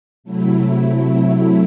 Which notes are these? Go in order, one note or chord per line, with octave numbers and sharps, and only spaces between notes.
C3 F#3 A3 E4